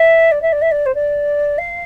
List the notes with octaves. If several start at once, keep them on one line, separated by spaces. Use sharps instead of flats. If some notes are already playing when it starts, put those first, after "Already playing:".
Already playing: E5
D5
E5
D5
E5
D5
C5
D5
F5